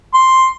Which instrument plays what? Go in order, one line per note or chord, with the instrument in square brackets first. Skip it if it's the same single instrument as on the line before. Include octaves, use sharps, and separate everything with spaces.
[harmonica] C6